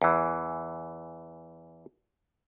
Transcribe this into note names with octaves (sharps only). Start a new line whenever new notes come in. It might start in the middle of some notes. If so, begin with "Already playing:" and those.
E2 E3